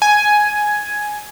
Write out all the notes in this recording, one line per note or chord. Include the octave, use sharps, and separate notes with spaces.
G#5